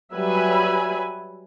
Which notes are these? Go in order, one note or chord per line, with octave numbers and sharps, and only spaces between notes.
F#3 G3 B4 E5 G#5 B5